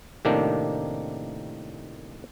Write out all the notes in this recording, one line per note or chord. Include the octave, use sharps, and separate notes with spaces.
A2 C3 D#3 A#3 D4